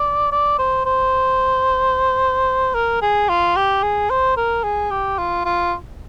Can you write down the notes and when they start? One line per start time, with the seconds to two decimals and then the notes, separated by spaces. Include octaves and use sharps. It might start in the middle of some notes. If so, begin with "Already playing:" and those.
Already playing: D5
0.32 D5
0.59 C5
0.85 C5
2.74 A#4
3.02 G#4
3.29 F4
3.56 G4
3.83 G#4
4.10 C5
4.37 A#4
4.63 G#4
4.91 G4
5.18 F4
5.45 F4